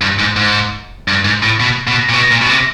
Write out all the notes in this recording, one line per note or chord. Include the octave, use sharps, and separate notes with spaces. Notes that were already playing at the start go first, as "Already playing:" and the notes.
G2
G#2
G#2
G2
G#2
A2
B2
B2
A#2
B2
A#2
B2
C3